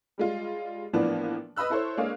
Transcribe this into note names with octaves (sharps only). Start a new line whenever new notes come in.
G3 G#3 F4
A2 E3 F3 A#3 B3 D4
B4 D#5 B5 E6 F#6
E4 A4 C5 C#5
G#3 A#3 D4 G#4 C#5 F5